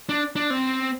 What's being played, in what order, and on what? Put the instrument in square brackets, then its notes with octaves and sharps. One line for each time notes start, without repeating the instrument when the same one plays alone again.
[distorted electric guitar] D4
D4
C4